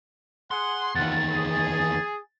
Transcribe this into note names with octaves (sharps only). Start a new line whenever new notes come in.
G#4 F#5 C6
E2 D#3 E4 F4 F#5 A6
G#4